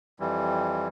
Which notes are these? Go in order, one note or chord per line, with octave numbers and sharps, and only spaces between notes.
F2 E3 G3